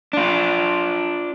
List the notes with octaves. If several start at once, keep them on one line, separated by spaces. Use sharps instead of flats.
D4 F4